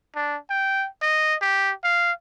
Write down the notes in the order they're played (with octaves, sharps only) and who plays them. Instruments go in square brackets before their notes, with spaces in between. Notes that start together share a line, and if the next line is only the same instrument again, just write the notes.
[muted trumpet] D4
G5
D#5
G4
F5